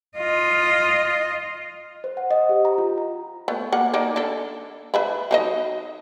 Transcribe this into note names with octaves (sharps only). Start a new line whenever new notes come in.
F4 D#5
C5
F#5
D#5
G4
A#5
F4
A#5
A3 B3
A#3 F#5
A#3 D#4 D5
D4 A4
B4 E5 B5
F#3 D#4 D#5